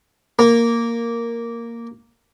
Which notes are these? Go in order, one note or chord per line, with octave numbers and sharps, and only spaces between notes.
A#3